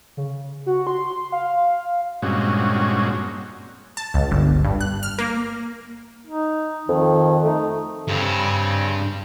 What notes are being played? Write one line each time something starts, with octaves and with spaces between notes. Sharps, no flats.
C#3
F#4
C6
F5
G2 A#2 G#3 C4 C#4 F#4
A5
C#2
G1
G2
F#6
F6
A#3
D#4
F2 D#3
A3 D#4
G2 C#3 C4